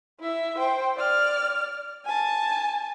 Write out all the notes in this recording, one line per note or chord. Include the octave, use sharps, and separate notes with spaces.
E4 E5
C5 G5
D5 F6
G#5 A5